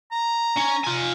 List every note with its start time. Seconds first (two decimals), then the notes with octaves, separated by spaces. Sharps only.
0.12 A#5
0.56 C#4
0.84 F4 G#5